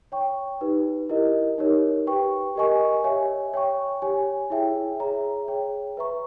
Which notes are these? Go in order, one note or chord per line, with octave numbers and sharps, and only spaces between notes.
C#5 G5 C#6
D#4 G4 B4
E4 G4 A#4 D#5
D#4 G4 A#4 C#5
G4 B4 G5 C#6
G4 A#4 D#5 G#5 C#6
G4 C#5 E5 G#5
C#5 G5 C#6
G4 C#5 G#5
E4 G#4 C#5 E5 G5
G#4 C#5 E5 A#5
G#4 C#5 G5
B4 E5 A#5 C#6